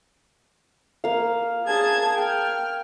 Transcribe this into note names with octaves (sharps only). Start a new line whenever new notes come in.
A#3 F5
G#4 A5 G#6
G5 F6